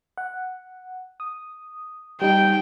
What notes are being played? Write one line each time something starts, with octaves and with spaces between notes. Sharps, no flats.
F#5
D#6
G3 D#4 G5